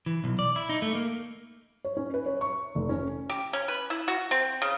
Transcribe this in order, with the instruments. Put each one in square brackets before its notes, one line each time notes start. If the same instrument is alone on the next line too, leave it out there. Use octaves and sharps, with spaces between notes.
[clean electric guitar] E3
B1
D5
E4
D#4
A3
A#3
[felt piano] C#5
C#4
B4
C#5
C#6
F1
C#4
[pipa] G4
C#4
B4
E4
F#4
C4
C#3